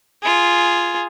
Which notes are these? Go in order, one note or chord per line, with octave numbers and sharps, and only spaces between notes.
F4 G#4